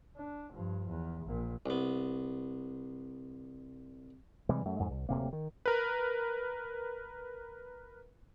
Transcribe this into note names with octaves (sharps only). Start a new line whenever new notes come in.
D4
G2 F3
E2
A#1 A#2
C2 B3
C3 E3 G3 G#3
F#2 A3
F2 G#2
C2
D1 C3 A#3
D#3
A#4 B4